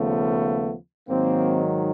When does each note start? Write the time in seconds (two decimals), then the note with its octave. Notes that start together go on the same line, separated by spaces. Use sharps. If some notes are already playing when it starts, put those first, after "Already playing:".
Already playing: D#2 C#3 F3 A3 B3
1.08 G#2 D#3 F#3 A#3 C4